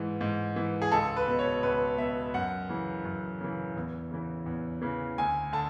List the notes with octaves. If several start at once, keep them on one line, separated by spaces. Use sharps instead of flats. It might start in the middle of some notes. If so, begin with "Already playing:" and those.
Already playing: G#2 E3
G#2
E3
G#4
C#2 A4
B4
B2
C#5
C#2 B4
B2 E5
F#2 F#5
C#3 E3
F#2
C#3 E3
E2
C#3 E3
E2
C#3 E3
D2 G#5
D3 A5